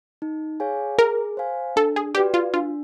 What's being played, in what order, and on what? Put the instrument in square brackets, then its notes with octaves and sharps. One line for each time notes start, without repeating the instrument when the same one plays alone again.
[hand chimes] D#4
G#4 C#5 F5 G#5
[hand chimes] G#4 [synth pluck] A#4
[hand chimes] C5 F5 G#5
[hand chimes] D4 [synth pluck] A4
[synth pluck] G#4
[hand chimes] F#4 B4 D5 [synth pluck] G4
[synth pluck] F4
[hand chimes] D4 [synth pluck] F4